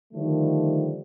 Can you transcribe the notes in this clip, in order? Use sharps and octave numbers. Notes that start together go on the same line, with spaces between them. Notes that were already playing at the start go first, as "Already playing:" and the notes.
D3 D#3 F3 G3 A3